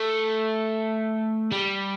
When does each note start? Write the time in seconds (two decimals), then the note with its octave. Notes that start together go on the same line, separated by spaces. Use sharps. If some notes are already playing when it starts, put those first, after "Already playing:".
Already playing: A3
1.52 G3